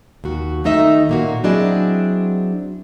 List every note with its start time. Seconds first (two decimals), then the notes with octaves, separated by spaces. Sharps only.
0.24 D#2 F#4
0.64 D#3 A3 D#4 D#5 E5
1.09 A#2 A#3 F#4
1.44 F#3 C4 D4 E4 G#4 D#5